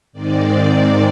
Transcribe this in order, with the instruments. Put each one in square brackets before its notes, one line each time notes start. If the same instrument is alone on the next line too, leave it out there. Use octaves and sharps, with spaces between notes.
[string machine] G#2 D#3 G#3 C4 D5